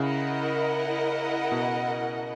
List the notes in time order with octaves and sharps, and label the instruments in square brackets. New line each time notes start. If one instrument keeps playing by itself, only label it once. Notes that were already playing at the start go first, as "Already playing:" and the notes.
Already playing: [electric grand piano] C#3 [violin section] E4 A#4 D#5 F#5
[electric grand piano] B2